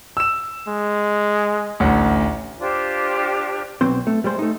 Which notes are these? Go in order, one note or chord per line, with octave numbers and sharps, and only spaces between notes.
E6 E7
G#3
A1 D2 F#5
D4 F4 G4 C5
B1 F#3 B3 C4 C5
A3
G3 G#3 C5
A3 D#4